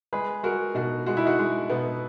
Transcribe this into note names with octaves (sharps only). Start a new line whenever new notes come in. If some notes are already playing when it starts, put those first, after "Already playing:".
G#3 G#4 B4
G#3 F#4 A#4
B2 D#4 F#4
G#3 F#4
E4
D#4 F#4
G#3
B2 B3 D#4